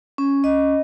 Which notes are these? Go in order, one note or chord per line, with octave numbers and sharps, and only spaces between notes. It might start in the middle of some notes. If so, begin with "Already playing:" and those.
C#4
D#5